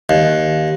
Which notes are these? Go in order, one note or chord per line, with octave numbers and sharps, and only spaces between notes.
D#2